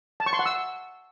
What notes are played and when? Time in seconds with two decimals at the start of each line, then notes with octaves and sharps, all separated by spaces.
0.20 A5
0.26 C#6
0.33 C6
0.39 F#5
0.46 E6